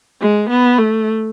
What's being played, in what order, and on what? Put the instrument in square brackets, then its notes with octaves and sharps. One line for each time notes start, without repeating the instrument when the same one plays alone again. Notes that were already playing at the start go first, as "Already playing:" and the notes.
[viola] G#3
B3
A3